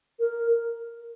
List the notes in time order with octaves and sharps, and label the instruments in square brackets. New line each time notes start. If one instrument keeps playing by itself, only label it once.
[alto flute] A#4